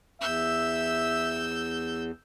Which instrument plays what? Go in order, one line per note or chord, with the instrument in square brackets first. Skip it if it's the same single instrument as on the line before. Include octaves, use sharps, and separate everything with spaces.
[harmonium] E2 [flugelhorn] E5 [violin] E6 G6